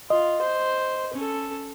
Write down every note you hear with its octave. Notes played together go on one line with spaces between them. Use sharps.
F4 D#5
C5
C#4 A4